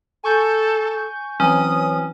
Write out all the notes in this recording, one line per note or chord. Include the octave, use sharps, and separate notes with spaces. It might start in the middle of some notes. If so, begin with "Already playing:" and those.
A4 G#5 C#6 G6
E3 F#3 C4 C#4 D#6